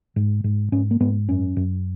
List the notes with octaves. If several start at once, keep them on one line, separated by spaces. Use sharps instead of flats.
G#2
G#2
G#2 C#4
A#3
G#2 B3
F#2 C#4
F#2